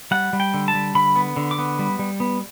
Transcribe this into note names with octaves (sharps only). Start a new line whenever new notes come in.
G3 F#5
G3
G5
D3
A5
G3
D3 B5
B3
D3
D6
B3
G3
G3
B3